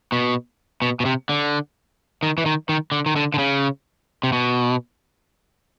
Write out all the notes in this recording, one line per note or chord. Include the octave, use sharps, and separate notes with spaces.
B2
B2
B2
C3
D3
D#3
E3
D#3
D#3
D3
D#3
D3
D3
C#3
C3
B2